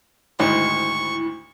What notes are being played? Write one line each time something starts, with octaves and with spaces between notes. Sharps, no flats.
D2 G#2 D#3 E4 C#6